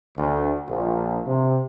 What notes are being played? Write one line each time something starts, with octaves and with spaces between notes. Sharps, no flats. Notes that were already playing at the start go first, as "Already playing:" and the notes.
D2
A#1
C3